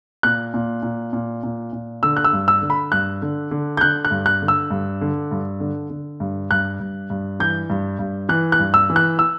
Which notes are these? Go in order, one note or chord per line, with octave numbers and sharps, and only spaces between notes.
A#2 F#6
A#2
A#2
A#2
A#2
A#2
D3 E6
F#6
E6
G2
E6
D3
B5
G2 F#6
D3
D3
G6
D3 F#6
F#6
G2
F#6
D3
E6
G2
D3
G2
D3
D3
G2
G2 F#6
G2
G2
E3 G6
G2
G2
E3 F#6
F#6
G2
E6
E3
F#6
E6